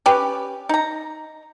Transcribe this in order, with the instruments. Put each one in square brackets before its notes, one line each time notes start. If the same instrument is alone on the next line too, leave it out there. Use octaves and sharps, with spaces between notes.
[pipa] C#4 G4 B4
D#4 A#5